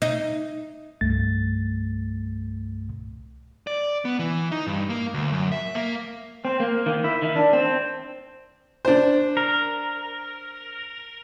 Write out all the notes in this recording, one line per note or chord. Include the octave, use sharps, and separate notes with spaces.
D#4
C2 G2 A3 A6
D5
B3
E3
D#4
G2
A#3
D2
F#2
E5
A#3
C4
A#3
D#3
E4
D#3
D4
C4
D4 C5
A#4